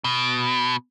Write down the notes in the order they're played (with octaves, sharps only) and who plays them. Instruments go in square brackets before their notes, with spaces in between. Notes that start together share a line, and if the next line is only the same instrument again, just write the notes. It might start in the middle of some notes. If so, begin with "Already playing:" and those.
[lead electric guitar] B2